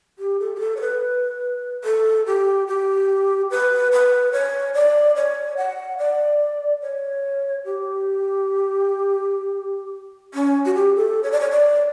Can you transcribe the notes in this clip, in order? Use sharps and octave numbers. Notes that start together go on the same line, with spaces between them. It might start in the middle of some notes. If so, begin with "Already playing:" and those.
G4
A4
G4
A4
C#5
B4
A4
G4
G4
B4
B4
C#5
D5
C#5
F#5
D5
C#5
G4
C#4
F#4
G4
A4
C#5
D5
C#5
D5